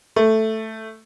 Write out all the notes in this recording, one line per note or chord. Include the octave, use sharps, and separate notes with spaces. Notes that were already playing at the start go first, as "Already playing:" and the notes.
A3